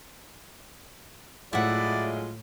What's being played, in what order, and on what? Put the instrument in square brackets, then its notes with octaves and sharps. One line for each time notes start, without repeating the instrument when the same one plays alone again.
[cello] A2 [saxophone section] F#3 G#3 F4 [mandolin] E4 F#5 [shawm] D5